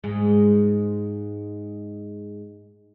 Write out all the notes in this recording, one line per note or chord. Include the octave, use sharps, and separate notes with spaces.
G#2 G#3